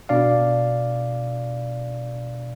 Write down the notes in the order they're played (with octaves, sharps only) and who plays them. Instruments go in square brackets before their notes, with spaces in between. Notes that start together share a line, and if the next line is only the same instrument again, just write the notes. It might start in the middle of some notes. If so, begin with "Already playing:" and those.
[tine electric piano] B2 D4 D5 F5